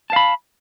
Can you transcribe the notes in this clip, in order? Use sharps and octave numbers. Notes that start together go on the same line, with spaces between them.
F5 A5 B5